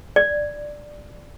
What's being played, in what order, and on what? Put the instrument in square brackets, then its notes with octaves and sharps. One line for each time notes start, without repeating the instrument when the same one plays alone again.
[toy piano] D5